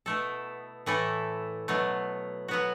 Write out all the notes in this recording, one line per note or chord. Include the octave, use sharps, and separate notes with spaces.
B2 A3 E4 A4
A2 E3 A3 E4 A4
B2 F#3 A3
F#3 B3 F#4